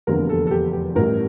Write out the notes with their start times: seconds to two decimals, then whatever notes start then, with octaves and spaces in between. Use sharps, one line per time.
0.07 F1 E2 D3 G3 A#3 A#4
0.29 A4
0.47 A4
0.51 G4
0.73 G4
0.95 A1 A2 G3 A#4